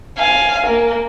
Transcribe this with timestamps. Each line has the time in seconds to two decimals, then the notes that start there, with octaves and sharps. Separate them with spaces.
0.17 F5 G#5
0.65 A#3